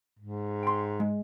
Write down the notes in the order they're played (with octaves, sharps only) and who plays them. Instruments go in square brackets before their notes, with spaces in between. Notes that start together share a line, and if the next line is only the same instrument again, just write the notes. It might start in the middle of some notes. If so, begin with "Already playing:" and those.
[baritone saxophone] G#2
[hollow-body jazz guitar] G5 C6
G#3